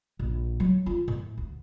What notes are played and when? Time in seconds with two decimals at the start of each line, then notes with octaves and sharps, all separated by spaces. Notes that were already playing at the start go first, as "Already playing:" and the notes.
0.19 A#1
0.60 F#3
0.86 F4
1.08 A2
1.38 D2